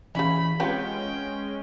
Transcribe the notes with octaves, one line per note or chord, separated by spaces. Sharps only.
C#3 E3 C#4 E4 B5
G#3 C4 C#4 F4 G4 B4 F#5 G5